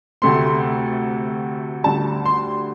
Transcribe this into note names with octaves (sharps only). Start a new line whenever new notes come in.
D2 C3 A3 C4 C6
D2 D3 G3 A5
C6